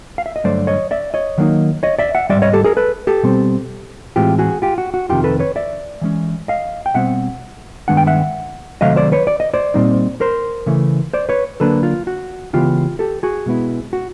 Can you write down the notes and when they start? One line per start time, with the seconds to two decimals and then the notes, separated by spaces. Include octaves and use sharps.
0.18 F5
0.26 E5
0.36 D#5
0.44 G2 D3 F#3 A3 C5 D5
0.67 C#5 D#5
0.91 D5 E5
1.14 C#5 D#5
1.38 D#3 F#3 A#3 D#4
1.83 C#5 D#5
1.99 D5 E5
2.15 E5 F#5
2.29 G#2 E3 G3 D5 E5
2.42 C#5 D#5
2.53 G4 A4
2.64 G#4 A#4
2.77 A4 B4
3.07 G4 A4
3.23 B2 G3 C4
4.16 A2 E3 G#3 C4 F4 G4
4.39 F#4 G#4
4.62 F4 G4
4.78 F#4
4.94 F#4
5.09 F2 C3 D#3 F4 G4
5.24 A4 B4
5.39 B4 C#5
5.56 D5 E5
6.02 E3 G#3 C#4
6.48 D#5 F5
6.86 G5
6.94 B2 G3 C4 E5 F#5
7.88 G2 D#3 G#3 B3 D4 F#5
7.97 G5
8.07 E5 F#5
8.81 C3 D#3 F#3 A3 D#5 F5
8.96 C5 D5
9.12 B4 C#5
9.27 D5
9.40 D#5
9.54 C5 D5
9.74 A#2 G3 C4 D#4
10.21 A#4 C5
10.66 C#3 E3 A3
11.13 C5 D5
11.29 B4 C#5
11.60 D3 F#3 A#3 D4 A4 B4
11.83 F4
12.07 F#4
12.53 C#3 E3 G#3 B3 F4 G4
12.99 G4 A4
13.23 F#4 G#4
13.46 B2 G#3 B3 E4
13.93 F#4